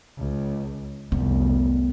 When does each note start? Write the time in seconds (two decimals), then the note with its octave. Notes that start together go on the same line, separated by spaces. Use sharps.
0.18 C#2
1.12 F1 C2 B3